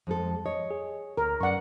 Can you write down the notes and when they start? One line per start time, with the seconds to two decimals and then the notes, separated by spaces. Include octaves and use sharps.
0.07 F2 G#3 A4
0.46 C#5 D#5
0.71 G#4
1.17 D2 A#4
1.41 F#2 D5 F#5 C#6